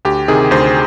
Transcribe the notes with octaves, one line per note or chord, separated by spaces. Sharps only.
D2 G4
C3 D#3 G#4
D2 C5